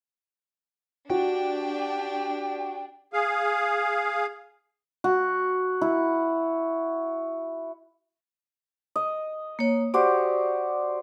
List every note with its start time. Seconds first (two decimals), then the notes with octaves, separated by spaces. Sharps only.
1.10 D4 F#4 G4 G5
3.13 G#4 F5
5.04 F#4
5.81 E4
8.96 D#5
9.59 A#3 C#5
9.94 F#4 G4 C5 D5